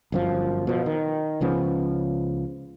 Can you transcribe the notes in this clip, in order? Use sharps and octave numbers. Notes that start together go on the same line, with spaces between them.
G1 F#2 F3
B2 F3
D#3
C#2 C#3 F3 B3